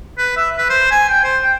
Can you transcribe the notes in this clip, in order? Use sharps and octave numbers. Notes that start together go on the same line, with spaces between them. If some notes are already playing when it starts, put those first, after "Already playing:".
B4
E5
B4
C5
G#5
G5
C5
G5